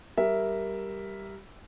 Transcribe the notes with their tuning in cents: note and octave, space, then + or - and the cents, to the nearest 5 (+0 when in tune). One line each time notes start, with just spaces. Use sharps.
G3 +0 A#4 +0 E5 +0